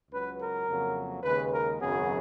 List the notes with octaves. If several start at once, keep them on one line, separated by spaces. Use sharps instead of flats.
C#2 C#3 F#3 B4
A#4
F2 C#3 F#3 A#3
D#2 C#3 G#3 B4
A#4
G#1 F#2 C#3 F#3 B3 G#4